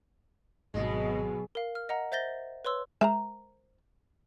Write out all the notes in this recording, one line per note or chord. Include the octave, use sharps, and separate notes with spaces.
G#1 B2 F#3 G#3 D#5
A#4 F5
F6
D#5 F#5 A#5
C5 E5 G6 A6 A#6 G7
B4 C#5 C6 E6
G#3 A#4 C5 E5 A#5